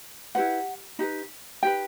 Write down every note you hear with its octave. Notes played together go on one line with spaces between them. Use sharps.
E4 G4 B4 F#5
D#4 G4 B4
D#4 G4 B4 G5